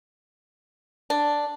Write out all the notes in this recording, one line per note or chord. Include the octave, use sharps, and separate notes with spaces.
D4